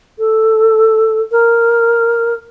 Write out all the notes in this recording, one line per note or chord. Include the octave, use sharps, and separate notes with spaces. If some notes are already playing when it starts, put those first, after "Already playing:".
A4
A#4